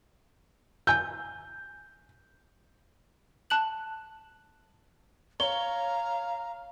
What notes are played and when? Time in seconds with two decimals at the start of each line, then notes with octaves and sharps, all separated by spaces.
0.87 G#5 E6 G6
3.50 A5 F#6 F#7
5.40 C#5 F5 A#5 G7